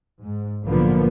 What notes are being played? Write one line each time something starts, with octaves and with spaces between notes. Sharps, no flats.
G#2
B1 A2 D3 F3 A#3 B3